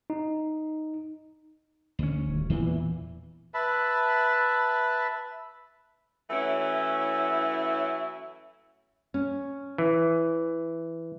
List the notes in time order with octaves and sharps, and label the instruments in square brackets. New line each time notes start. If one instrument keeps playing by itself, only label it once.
[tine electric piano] D#4
[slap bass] D2 C#4
[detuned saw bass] D#1
[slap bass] E2 A#2 [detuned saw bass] E3
[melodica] B4 E5 A5 B5
[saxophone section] E3 F#3 A3 C#4 E4
[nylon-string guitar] C#4
[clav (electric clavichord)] E3